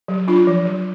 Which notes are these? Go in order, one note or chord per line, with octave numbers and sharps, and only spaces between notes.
F#3
D4 F4
F3
F#3